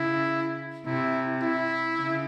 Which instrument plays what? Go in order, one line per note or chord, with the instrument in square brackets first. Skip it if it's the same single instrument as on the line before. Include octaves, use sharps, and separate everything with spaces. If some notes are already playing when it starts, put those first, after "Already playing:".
Already playing: [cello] C#3 [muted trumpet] E4
[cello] C3 [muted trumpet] E4
[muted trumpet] E4
[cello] C#3